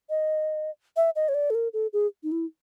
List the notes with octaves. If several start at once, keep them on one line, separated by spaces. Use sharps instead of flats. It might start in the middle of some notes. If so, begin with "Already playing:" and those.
D#5
E5
D#5
C#5
D5
A4
A#4
A4
G#4
D#4
E4